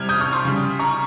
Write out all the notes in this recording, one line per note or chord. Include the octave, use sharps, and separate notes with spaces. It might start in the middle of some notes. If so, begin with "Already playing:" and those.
Already playing: C3 G3 F6 G#6
D#6 G6
C#6 F6
C6 D#6
C#3 G3
A#5 C#6